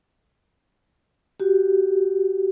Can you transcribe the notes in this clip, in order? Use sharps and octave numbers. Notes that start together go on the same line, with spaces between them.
F#4 G4